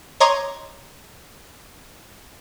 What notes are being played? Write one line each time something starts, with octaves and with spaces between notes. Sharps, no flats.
C#5 D#5 A#5 C6 D6 G#6